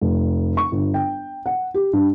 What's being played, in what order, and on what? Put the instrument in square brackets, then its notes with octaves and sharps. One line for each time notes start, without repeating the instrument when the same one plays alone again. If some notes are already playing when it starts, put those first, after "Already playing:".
[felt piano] F1
C#6
G1
G5
F#5
G4
G2